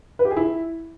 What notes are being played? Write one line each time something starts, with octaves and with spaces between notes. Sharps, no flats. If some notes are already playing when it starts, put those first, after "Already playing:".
B4
G4
G#4
E4